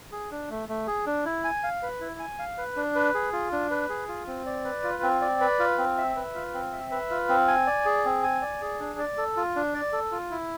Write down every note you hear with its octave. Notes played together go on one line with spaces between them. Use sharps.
G#4
D4
A3
A3
G#4
D4
E4
G#5
F5
B4
E4
G#5
F5
B4
D4
B4
G#4
F4
D4
B4
G#4
F4
C4
D5
B4
F4
C4
D5
B4
F4
C4
E5
B4
F4
C4
E5
B4
F4
C4
G#5
D5
G#4
C4
G#5
D5
G#4
D4
D5
A4
F4
D4
D5
A4
F4
E4